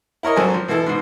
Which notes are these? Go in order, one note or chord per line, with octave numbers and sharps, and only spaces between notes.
E4 A#4 C#5 D#5
G#1 F#3 C4 A4 G#5
F3
B2 E3 E4 A4
G#2 B2